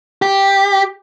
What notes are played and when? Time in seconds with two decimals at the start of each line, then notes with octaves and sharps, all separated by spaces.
0.22 G4